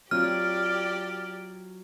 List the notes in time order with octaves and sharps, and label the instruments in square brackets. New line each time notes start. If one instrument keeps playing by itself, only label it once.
[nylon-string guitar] F#3 C4 F4 [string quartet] G4 D5 [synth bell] F6